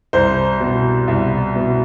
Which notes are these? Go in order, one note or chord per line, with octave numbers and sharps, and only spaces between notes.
C2 C5
B2
C2
B2